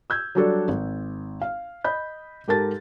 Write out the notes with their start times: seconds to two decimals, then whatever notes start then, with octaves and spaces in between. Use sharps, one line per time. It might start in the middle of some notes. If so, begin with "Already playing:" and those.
0.10 E6 G6 G#6
0.35 F#3 G3 D4 F#4 A4 D5
0.68 G#1
1.42 F5
1.84 D#5 B5 G6
2.48 G#2 G4 A4 A#4 A5 A6